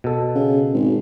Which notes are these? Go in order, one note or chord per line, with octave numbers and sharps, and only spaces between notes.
B2 A4
C#3
G#1